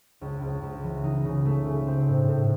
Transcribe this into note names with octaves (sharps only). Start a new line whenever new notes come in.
C#2
C#2
C#2
E3
D#4
C#3
A3
C#3
C4
A2
A2